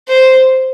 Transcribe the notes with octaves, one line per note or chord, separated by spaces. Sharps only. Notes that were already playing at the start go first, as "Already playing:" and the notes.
C5